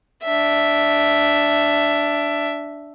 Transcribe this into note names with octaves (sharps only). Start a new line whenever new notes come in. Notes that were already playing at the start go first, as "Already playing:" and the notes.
D4 E5